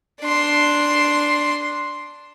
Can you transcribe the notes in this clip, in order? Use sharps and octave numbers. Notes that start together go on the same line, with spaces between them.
D4 C6